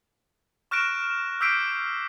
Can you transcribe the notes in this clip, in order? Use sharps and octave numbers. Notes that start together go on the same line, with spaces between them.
C#6 F6 F#6 A#6 D7 E7
D6 E6 G6 B6 C7 D7